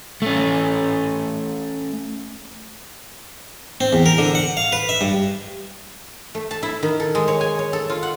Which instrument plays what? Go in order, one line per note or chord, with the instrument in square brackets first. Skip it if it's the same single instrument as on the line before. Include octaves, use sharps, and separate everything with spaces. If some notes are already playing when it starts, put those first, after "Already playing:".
[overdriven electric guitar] A3 C#4
[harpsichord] C4
E2
A#4
D3
F#5
F5
B4
E5
G2
[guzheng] A3
A5
E4
D#3
A4
G#3
C#5
G#5
C#5
A4
F4
F#5